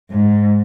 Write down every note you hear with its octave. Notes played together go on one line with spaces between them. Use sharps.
G#2